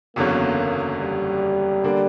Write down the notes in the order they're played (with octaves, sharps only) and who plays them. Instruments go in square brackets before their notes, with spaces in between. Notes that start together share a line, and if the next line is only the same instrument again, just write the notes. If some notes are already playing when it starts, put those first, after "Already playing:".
[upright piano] F#1 E2 D3 F#3 C#4 [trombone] A#3
[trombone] G3
[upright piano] D3 A#3 D4